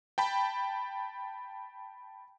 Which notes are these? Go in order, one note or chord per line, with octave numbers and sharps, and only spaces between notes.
G5 A5 B5